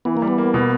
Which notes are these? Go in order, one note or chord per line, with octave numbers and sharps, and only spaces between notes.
E3 B3
A#3
G3
B3
A#3
B2